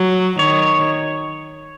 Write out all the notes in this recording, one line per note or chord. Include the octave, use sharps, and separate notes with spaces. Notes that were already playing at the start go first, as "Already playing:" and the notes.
Already playing: F#3
D#3 C#5